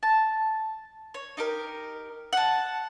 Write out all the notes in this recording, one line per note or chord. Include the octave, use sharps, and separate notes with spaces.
A5
C#5
D#4 G4 A#4
F#5 A5